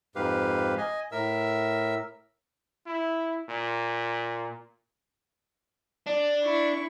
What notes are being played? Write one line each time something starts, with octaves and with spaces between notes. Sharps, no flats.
F2 G#2 G4 B4 F5
D#5 G#5
A2 A#4 E5 E6
E4
A#2
D4
E4 C#6